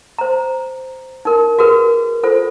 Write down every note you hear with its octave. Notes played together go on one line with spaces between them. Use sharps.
C5 A#5
D#4 A#4
F#4 G#4 A#4 B4
F4 A4 C5